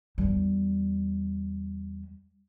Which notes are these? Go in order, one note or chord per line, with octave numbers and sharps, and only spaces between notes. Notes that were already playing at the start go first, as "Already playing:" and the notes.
E2 G3